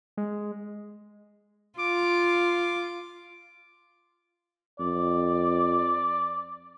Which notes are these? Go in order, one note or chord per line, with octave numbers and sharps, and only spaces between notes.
G#3
F4 D6
F2 D5